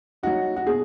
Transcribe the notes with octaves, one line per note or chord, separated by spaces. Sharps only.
F#3 D#4 F#4
F#4
B2 G#4